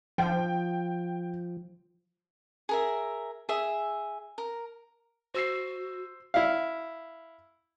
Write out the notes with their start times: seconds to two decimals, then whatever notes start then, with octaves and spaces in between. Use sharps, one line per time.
0.18 F3 G5
2.69 G#4 A#4 E5
3.49 G#4 E5
4.38 A#4
5.34 F#4 C5 E6 C7
6.34 E4 F5